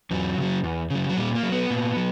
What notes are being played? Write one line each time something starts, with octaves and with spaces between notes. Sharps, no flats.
E2 F#3
C#3 F#3
E2
C#3 F#3
F#3
A#2 G3
A#3
F#3
B3
A#2
F#3